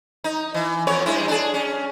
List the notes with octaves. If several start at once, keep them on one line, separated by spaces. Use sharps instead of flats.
D#4
E3
F2 B3 C#5
G2 G#3 E4
D4 G#4
C#4